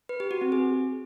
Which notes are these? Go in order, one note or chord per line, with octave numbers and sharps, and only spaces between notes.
B4
G4
F#4
C4
G#4